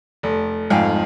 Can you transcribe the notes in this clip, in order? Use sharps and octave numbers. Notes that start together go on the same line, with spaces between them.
F1
G1 F2 G#2 F5 G5 G#5